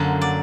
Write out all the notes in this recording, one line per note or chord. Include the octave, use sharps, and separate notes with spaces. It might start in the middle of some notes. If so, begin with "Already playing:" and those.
Already playing: F#2 D3 F#3 A#3
D5